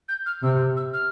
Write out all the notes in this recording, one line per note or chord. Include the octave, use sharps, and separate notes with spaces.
G6
F6
C3 E6
E6
F6